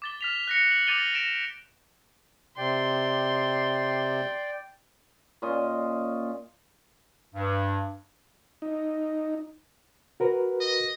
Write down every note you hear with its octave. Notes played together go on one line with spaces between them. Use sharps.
D6 A6 G7
F6 B6 F7
F#6 A#6 C#7
F#7
D6 G6 A6 D#7 F7 G7
A#6 D7 E7
C3 D5 G5 C6
A#2 C#4 D#5 C6
G2
D#4
F#4 A#4 B4
D#5